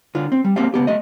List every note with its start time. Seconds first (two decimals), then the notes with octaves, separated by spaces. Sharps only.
0.15 D3 F4
0.32 C4
0.44 G3
0.56 A#3 C4 G4 F5
0.74 C#2 B3 G4
0.87 A3 D#5